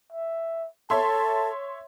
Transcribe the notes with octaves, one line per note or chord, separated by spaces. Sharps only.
E5
A4 C#5 E5 A5 C6